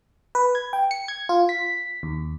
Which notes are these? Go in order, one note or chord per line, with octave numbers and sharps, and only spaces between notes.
B4
G#6
G5
C#7
G#6
F4
B6
D#2